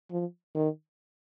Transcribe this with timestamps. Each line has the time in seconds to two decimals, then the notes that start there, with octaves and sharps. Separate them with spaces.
0.11 F3
0.55 D#3